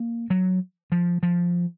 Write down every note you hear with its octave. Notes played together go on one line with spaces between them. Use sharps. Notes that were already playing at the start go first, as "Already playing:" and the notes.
Already playing: A#3
F#3
F3
F3